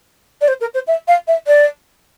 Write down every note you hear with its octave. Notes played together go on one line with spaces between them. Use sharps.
D5
C5
A#4
C5
E5
F5
E5
D5